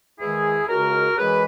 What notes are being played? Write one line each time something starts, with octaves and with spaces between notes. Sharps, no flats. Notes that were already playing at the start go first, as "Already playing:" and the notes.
E2 D#3 G#3 E4 G#4
C#2 C#3 G#3 F#4 A#4
F#2 E3 G#3 G#4 B4